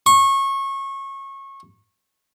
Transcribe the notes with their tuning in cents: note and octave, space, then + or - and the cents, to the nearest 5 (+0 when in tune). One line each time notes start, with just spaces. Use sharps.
C#6 -25